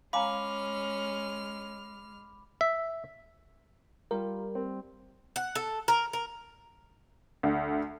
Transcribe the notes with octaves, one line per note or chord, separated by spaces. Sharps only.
G#3 C#4 F5 G#5 A#5 B5 D6 F6
E5
G3 F4 A#4
C4
F#5
A4
A#4
A#4
D2